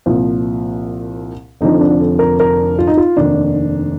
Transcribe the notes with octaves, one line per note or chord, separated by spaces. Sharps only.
C2 A#2 F3
F1 F2 D3 F3 D#4
D4
A4
A#4
A#4
F4
D#4
F4
F1 D#2 D#3 D4